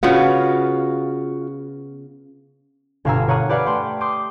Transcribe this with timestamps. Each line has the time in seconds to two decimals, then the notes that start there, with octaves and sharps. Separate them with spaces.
0.03 C#3 B3 F4 F#4 F5
3.05 G1 B2 F5 G#5 A#5 E6
3.28 A#4 C#5 F#5 A#5 D#6
3.49 G4 B4 D5 F5 F#5 G#5
3.66 A3 G5 C6
4.01 C6 D6 D#6 G6